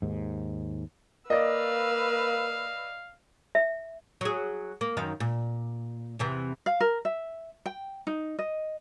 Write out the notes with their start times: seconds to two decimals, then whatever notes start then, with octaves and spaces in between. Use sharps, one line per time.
0.02 D#2 G#2
1.30 A#3 B4 D5 D#5 F5 E6
3.55 E5
4.21 F#3 G#4
4.81 A#3
4.97 F#2 D#3 F5
5.20 A#2
6.19 E2 C3 E3
6.66 F5
6.80 A#4
7.05 E5
7.66 G5
8.07 D#4
8.39 D#5